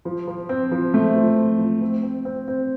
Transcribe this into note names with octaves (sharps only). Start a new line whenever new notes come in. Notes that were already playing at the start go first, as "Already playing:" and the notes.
F3
F3
C4
F3
A3
F3
C4
F3
C4
C4
C4
C4